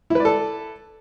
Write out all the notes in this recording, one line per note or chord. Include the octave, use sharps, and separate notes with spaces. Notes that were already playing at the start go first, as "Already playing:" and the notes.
E4 A4 B4 D5